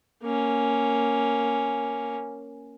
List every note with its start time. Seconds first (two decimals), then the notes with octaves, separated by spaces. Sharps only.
0.23 A#3 C#4